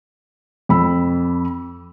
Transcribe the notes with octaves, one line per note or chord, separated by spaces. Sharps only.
F2 B5 E6